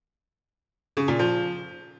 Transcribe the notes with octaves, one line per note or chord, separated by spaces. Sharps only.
C#3
A#2
F3